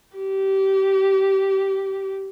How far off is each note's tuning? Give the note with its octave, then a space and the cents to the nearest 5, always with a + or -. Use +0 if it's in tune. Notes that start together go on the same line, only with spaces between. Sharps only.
G4 -20